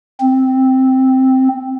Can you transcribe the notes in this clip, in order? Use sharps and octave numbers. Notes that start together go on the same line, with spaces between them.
C4